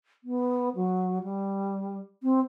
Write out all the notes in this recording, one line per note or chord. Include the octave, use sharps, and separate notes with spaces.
B3
F#3
G3
C4